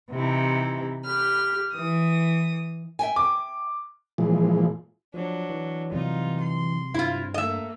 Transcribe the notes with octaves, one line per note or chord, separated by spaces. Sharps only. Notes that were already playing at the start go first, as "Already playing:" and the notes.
C3 E3 D#4 E4
G4 B5 F6
E3 D#6
E5 G5 G#5
D6
A#2 E3 F3 G#3
F3 F#3 D4
E3
C3 F#3 G3 D#4 F4
C6
G2 C4 E4 F4
A3 A#3 D#5 E5